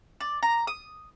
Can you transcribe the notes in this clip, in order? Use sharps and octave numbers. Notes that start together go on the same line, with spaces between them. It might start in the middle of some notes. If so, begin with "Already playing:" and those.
D5
A#5
D#6